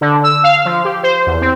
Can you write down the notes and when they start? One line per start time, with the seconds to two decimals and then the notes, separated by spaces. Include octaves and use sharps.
0.01 D3
0.24 E6
0.43 F5
0.65 F3
0.85 G4
1.03 C5
1.27 E2
1.41 C4